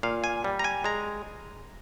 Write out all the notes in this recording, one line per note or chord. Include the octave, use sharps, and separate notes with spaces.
A#2 F5
G#5
G3
A#5
G#5
G#3 A#5